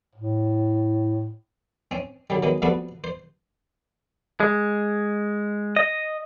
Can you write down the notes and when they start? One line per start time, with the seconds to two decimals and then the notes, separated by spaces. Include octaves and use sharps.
0.15 A2
1.91 C4 C#4
2.30 D3 F#3 G3
2.43 D#3 F#3 G#3 B3
2.62 F3 G3 A3 B3 C4 F#4
3.04 C5
4.40 G#3
5.76 D#5